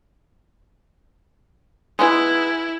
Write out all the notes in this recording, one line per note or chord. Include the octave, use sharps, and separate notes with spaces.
G#3 B3 D#4 E4